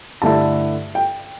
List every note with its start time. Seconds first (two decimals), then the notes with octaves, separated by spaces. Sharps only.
0.22 G2 D3 A3 E4 A5
0.95 G5